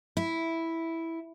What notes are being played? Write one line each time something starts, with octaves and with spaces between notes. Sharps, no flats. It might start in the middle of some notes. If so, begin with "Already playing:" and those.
E4